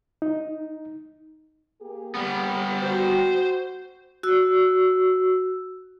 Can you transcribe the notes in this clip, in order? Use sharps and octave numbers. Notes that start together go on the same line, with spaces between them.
D#4
A#3 G4 G#4
G3 B3
F#4 C5
F#4 E6